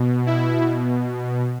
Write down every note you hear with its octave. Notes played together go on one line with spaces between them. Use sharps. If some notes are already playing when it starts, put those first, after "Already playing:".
Already playing: B2
E4